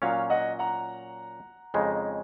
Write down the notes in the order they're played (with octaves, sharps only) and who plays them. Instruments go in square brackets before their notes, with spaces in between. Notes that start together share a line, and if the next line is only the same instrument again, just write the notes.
[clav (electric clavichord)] A#2 F#3 C#4 [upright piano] C#5 F5
[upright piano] D#5 F#5
F#5 A#5
[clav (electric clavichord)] F2 C#3 G#3 D#4